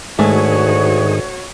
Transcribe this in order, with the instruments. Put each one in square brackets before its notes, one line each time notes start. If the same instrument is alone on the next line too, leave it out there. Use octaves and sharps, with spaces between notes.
[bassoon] D2 [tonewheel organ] G#2 D#3 G#4 [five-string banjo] G#3 A3 [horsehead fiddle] F#4 C#5